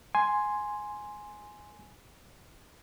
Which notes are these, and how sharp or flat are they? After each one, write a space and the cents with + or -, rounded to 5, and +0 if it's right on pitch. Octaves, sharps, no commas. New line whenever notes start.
G#5 +5 C6 +0